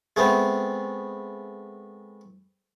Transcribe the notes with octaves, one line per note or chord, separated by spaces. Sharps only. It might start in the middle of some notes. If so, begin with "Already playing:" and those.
G#3 A3 B3 C4